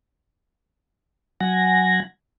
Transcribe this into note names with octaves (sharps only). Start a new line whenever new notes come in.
F#3 F#5 G#5 A#6